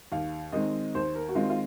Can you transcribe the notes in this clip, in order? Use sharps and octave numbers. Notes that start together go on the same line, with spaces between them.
D#2 F5
D#3 G#3 C4 D#5
D#2 C5
A#4
F#4
D#3 G#3 C4 F4
F4